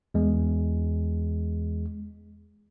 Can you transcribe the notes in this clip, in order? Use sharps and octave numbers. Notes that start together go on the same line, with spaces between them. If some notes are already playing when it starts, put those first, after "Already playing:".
E2 G#3